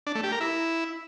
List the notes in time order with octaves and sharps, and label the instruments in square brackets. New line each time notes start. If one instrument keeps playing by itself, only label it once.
[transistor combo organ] D4
A3
G4
A#4
E4